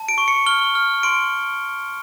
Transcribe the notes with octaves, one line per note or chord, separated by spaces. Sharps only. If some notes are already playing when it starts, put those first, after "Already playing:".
Already playing: A5
D7
C#6
C#7
F6 G7
F6
C6 D7